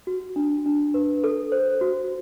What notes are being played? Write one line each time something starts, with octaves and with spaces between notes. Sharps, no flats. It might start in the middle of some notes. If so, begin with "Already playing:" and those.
F#4
D4
D4
B4
A4
C5
F#4